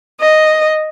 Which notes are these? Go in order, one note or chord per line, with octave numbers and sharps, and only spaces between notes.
D#5